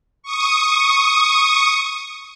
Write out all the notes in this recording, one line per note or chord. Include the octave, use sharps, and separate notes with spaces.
C#6 D#6